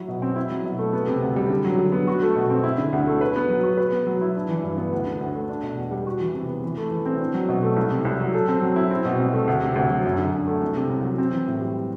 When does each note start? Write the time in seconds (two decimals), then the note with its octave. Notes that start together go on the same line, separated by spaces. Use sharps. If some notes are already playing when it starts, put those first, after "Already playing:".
Already playing: F#3 E4
0.08 B2
0.22 C4
0.36 E4
0.50 F#3
0.64 B2
0.78 A3
0.93 B3
1.07 C3
1.21 D2
1.36 G3
1.50 D3
1.65 F#3
1.78 D3
1.92 B3
2.07 F#4
2.22 A3
2.36 B2
2.50 C4
2.64 E4
2.78 D3
2.93 D2
3.07 A3
3.21 B4
3.36 B3
3.50 F#3
3.63 F#4
3.77 B4
3.92 B3
4.07 F#3
4.21 E4
4.36 D4
4.49 E3
4.63 G2
4.77 B3
4.92 D2
5.06 D3
5.20 D2
5.34 A3
5.49 D4
5.63 B2
5.77 E2
5.91 G3
6.07 F#4
6.20 E3
6.35 C3
6.48 B3
6.63 E3
6.77 A3
6.91 E3
7.06 C4
7.20 D4
7.34 F#3
7.49 B2
7.63 A3
7.76 C2
7.91 C3
8.05 C2
8.20 F#3
8.34 A4
8.48 C4
8.62 F#3
8.76 E4
8.90 C4
9.05 B2
9.20 C2
9.33 A3
9.48 D2
9.62 C3
9.76 D2
9.90 F#3
10.05 F#2
10.18 D3
10.33 F#2
10.47 A3
10.61 C2
10.76 C3
10.90 C2
11.04 F#3
11.18 C4
11.33 E3
11.48 A2
11.61 G3